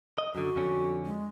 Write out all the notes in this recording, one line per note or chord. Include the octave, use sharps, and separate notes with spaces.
D#5
F#2 D3 F#4
F2 D3 C#4
G#3